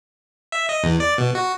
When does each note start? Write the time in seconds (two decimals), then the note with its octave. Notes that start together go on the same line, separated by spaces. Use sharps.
0.52 E5
0.69 D#5
0.83 E2
1.00 D5
1.18 B2
1.35 F#4